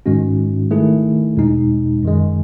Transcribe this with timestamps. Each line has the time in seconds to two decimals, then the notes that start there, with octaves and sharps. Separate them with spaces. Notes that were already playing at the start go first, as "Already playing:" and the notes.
0.06 G#2 D#3 G#3 C#4 F#4
0.71 D#3 A3 E4 G#4
1.37 E2 B2 G#3 D#4
2.03 F#2 D#3 G#3